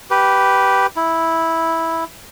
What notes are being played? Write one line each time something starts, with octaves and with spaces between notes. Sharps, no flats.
G4 B4
E4